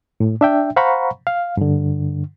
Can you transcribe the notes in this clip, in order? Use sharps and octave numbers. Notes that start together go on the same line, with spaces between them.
A2
D4 E5 G5
C5 F5 F#5 A#5 B5 C#6
F5
G2 D3